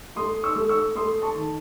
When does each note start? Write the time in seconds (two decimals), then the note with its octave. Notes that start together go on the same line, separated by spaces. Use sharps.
0.16 A3 C6 D#6
0.43 C#6 E6
0.56 A3
0.69 C#6 E6
0.95 A3 C6 D#6
1.22 A5 C#6
1.35 D#3